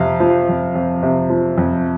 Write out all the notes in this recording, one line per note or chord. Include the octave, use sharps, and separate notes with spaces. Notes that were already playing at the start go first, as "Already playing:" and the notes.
Already playing: F2 C3 F5
F3
F2
F2
C3
F3
F2